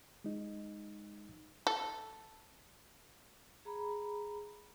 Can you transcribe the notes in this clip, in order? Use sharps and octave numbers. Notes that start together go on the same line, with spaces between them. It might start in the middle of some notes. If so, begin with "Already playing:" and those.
G#3 D#4
A4
G#4 A#5 B5